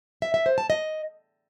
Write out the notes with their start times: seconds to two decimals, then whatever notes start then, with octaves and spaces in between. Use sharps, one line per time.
0.22 E5
0.34 E5
0.46 C5
0.58 A5
0.70 D#5